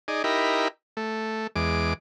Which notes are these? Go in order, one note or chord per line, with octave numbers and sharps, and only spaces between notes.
D#4 G#4 D5
D#4 E4 G4 A#4 B5
A3
E2 G#3 D6